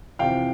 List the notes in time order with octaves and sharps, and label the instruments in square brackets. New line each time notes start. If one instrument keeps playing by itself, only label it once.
[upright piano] F2 C3 E3 F5 G5